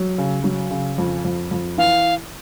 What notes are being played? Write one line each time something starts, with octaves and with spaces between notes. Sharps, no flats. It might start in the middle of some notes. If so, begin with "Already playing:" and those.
Already playing: F#3
C#3
F#3
C#3
F2
F2
F2
E3 F5